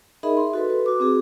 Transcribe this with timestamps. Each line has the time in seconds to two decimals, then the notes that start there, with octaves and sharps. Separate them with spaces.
0.23 D#4 G#4 A#4 D#5 E5 B5
0.37 C6
0.53 F#4 A4 B4
0.70 B4
0.86 F#4 D6
1.00 C4 F#4 G#4